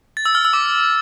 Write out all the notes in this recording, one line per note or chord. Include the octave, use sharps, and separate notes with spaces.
A6
E6
F6
E6
D6